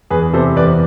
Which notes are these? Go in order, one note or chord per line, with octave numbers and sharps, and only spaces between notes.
E2 G#4 B4
C3 A4 C5
E2 B4 D5